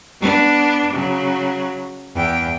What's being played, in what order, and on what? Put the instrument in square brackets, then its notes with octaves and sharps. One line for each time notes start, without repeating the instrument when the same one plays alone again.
[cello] B3 D4
C#3 F#3
E2 G5